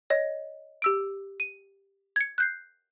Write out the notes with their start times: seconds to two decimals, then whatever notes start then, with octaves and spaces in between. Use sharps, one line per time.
0.10 C#5 D#5
0.82 G4 E6 D7
1.40 D#7
2.16 G#6 C#7
2.38 F#6 G6 C7